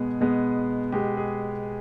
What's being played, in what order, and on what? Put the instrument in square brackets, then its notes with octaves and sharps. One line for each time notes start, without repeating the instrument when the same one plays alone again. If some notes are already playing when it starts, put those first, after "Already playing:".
Already playing: [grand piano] B2 G#3 B3 G#4
B2 G#3 B3
B2 G#3 B3 G4
G#4